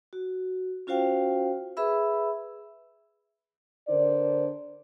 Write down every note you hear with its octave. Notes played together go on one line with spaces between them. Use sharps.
F#4
C#4 F4 F#4 C5 F5 G5
G#4 B4 E5 B5 E6
D3 D4 A#4 C5 D5